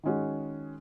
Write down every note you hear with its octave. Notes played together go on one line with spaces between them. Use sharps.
D#3 G#3 C#4 F#4